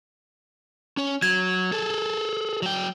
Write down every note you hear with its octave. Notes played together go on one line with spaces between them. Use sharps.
C#4 C#5
F#3 G#6
G#4 A4
F#3 G5